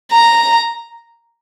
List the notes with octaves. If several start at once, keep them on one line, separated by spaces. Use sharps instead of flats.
A#5